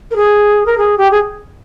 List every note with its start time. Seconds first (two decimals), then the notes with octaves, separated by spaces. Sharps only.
0.11 A#4
0.16 G#4
0.66 A#4
0.78 G#4
0.97 G4
1.11 G#4